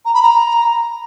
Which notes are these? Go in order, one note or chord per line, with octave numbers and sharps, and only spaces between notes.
A#5
B5
A#5